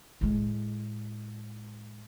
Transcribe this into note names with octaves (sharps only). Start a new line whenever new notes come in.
A2 G#3